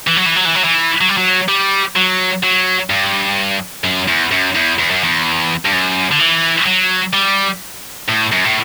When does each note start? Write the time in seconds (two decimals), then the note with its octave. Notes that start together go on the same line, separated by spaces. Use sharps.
0.07 E3
0.16 F#3
0.26 E3
0.36 F#3
0.45 E3
0.55 F#3
0.64 E3
1.01 F#3
1.09 G3
1.17 F#3
1.49 G3
1.96 F#3
2.43 F#3
2.90 G2
3.84 F#2
4.08 E2
4.31 F#2
4.55 E2
4.79 E2
4.91 F#2
5.03 E2
5.65 G2
5.72 F#2
6.11 D3
6.19 E3
6.66 F#3
7.14 G3
8.08 A2
8.32 F#2
8.44 A2